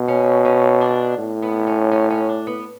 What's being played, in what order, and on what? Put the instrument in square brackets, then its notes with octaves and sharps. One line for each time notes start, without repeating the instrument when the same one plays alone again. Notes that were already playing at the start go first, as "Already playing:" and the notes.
Already playing: [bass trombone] B2
[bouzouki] C#4
C#4
D4
[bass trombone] A2
[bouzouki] B3
C#4
C#4
C#4
D4
B3